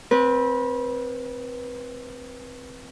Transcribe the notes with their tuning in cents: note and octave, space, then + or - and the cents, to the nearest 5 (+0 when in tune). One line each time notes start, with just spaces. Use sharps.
C4 +0 B4 -30